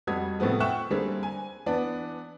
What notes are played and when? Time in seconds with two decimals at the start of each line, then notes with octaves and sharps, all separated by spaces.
0.07 F2 G3 F#4 D#6 G#6
0.39 A2 C3 F3 B3 G#4
0.60 E5 F#5 G5 C#6 F#6 E7
0.90 D3 G3 A#3 C4 G#4
1.23 G#5
1.66 E3 B3 D4